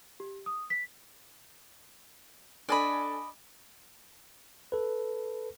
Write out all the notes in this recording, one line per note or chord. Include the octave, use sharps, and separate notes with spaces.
G4
D#6
B6
D4 A4 D5 D#5 G#5 B5
A4 B4